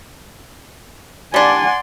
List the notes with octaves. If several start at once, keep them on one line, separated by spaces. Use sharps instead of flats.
G3 D4 D5 F#5 G#5 C6